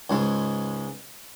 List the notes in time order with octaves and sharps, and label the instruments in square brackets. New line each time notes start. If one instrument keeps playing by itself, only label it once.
[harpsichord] C#2 G#2 G#3